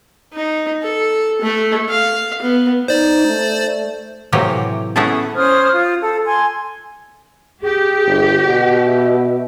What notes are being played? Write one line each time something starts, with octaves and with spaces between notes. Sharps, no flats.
D#4
A4
A3
F5
B3
D#4 C5 D5
A3
A2 C3 E3 F#3 A#3 G4
A3 B3 C#4 E4 G#4 A4
C#4 C5 D#6 F6
F4
A4
G#5 C6
G4 G#4
G1
B2 F#5
E5